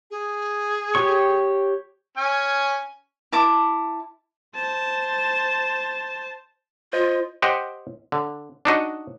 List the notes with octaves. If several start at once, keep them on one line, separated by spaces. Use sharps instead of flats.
G#4
G4 C#5 C#6
C#4 G#5
E4 A5 D6
C5 A5
F4 C5 D#5
G4 C5 D#5 F#5 G5
D3
D4 D#4 F#4 D#5